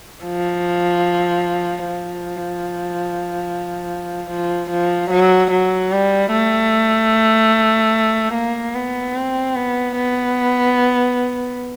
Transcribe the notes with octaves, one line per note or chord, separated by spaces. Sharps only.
F3
F3
F3
F3
F#3
F#3
G3
A3
A#3
B3
C4
B3
B3